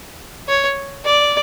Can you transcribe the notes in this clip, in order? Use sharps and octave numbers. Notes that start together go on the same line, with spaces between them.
C#5
D5